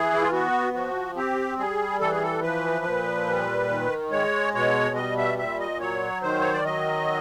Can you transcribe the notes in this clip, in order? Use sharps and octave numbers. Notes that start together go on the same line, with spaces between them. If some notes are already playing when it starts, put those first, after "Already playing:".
Already playing: E3 G#4
E4
F4
B3 F#4
F3 F#4
C4 G4
G3 G#4
E3 A4
G#4
A4
F3 B4
A#2
G3
D#3
G#3 C#5
B2 C#5
G3 D#5
E5
A#2 E5
D#5
F#3 C#5
D#3 C5
C#5
D5
F#3 D#5